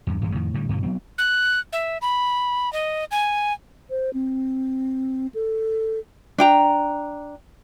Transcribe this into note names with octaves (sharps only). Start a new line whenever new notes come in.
E2 G2
A1 G2 E3 G#3
F2 A2 D#3
A2 D3 G3
G2 B2 D3 F3
F#3 B3 C4
F#6
E5
B5
D#5
G#5
C5
C4
A4
D4 G5 A#5